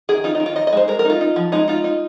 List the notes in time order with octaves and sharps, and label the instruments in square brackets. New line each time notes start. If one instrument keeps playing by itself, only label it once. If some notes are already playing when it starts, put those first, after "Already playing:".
[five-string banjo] D#3 G#4
D#4 F4
D#4
D#3
F4
D#4 D#5
D#5
G#3 C5
G#3 A#4
A#4
D#4 F4
D#4
F3
G#3 D#4
D#4 F4
D#4